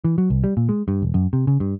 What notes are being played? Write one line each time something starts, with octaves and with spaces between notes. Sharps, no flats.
E3
F#3
C2
G3
A#2
G#3
G2
E1
F#2
C3
C#3
G2